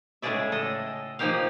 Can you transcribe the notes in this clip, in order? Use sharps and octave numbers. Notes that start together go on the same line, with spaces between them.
A2 C#3 G#3 G#4 D5 E5
A4 D#5
F3 A#3 D#4 G4 F5